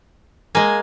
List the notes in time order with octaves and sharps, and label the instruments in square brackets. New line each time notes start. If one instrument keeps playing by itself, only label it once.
[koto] G#3 A#3 [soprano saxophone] G#5